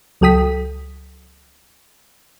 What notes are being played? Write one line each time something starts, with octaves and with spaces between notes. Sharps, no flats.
C#2 F#3 A4 G5 D#6 B6